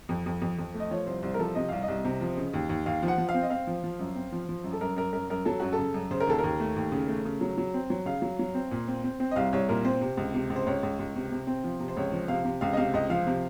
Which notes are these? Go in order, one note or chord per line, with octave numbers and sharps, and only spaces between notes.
F2
F2
F2
F2
A3
D#5
F3 C#5
C2 C5
C2 C5
A#4
F3 A4
C3 D#5
C2 F5
D#5
C2
C3
F3
C#3
D#2
D#2
D#2 F5
F3
F#5
F3
F5
C4
D#5
C4 F5
F3
F3
F#2
C4
F3
F3
F#2
A4
F#2 A#4
F#2 A#4
F#2 A#4
F#2 A#4
F#3 A4
F#2 F#4
A4
C#3
F#2
C#3 C5
A#4
D#2 A4
A#4
D#2
A3
D#2
C#3
A3
C#3
F#3
F#3
C4
F#3
C#3 F5
F#3
F#3
C4
A#2
C4
C4
C4
D#5
C2 F5
C2 C#5
A#2 A#4
C4 C5
C3
C#2
C3
C#2
C5
C#2 C#5
C#2
C#2
C3
C3
C4
F3
C3
C5
C#2 C#5
F3
C3 F5
C3
C#2 F5
D#5
C3 F5
C#2 D#5
F3 F5
C3